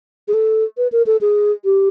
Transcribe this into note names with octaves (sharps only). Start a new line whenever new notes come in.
G#4
A4
B4
A#4
A4
G#4
G4